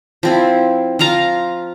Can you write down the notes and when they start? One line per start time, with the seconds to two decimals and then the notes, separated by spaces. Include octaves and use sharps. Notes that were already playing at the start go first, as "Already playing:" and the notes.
0.23 F3 C4 E4
0.99 F3 F4 F5 A#5